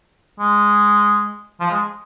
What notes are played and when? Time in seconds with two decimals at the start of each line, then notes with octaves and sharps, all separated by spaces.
0.40 G#3
1.60 F3
1.71 G#3